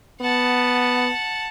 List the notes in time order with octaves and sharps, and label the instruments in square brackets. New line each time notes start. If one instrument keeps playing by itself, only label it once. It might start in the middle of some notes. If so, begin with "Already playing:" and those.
[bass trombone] B3 [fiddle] F#5 A5